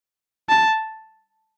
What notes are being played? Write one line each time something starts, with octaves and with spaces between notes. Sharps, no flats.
A5